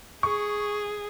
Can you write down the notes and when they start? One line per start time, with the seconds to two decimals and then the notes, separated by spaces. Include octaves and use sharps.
0.23 G#4 C#6